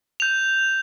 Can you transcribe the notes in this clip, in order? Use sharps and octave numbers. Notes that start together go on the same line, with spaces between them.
G6 F7